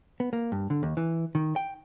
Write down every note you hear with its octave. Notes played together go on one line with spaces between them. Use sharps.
B3
A#3
G2
D3
D#2
E3
D#3
G5